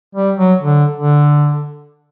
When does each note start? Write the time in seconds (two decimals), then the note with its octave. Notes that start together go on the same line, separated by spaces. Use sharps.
0.15 G3
0.37 F#3
0.61 D3
0.95 D3